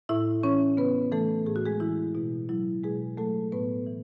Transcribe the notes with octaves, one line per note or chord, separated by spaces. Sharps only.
A2 E4 E5
E3 C#4 C#5
C#3 B3 B4
E3 A3 A4
A2 G#4
F#4
G#3 G#4
E3 E4
B2 E4
F#3 E4
B2 G#3 G#4
F#3 A3 A4
A2 B3 B4
E3